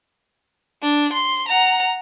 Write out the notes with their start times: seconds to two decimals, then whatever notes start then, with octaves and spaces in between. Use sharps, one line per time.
0.82 D4
1.12 C6
1.48 F#5 A#5